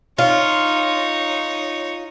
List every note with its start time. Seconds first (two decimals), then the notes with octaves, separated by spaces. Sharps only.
0.18 D#4 F4 C#5